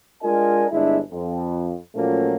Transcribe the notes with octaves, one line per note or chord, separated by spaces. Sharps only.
G#3 D4 F4 A#4 D#5 G#5
G1 G#3 D4 E4 E5
F2
A#2 F3 F#3 A3 A#3 C#4